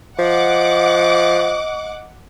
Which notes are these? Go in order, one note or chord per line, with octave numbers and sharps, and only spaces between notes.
F3 D#5 F#5 D6